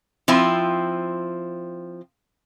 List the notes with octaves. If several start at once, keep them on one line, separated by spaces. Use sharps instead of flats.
F3 C4 E4 F4